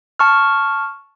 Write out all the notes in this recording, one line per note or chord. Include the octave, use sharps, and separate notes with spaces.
A5 C#6 F6